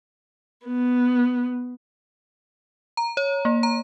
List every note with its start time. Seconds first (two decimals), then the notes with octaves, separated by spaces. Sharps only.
0.67 B3
2.97 A#5
3.17 C#5
3.45 A#3
3.63 A#5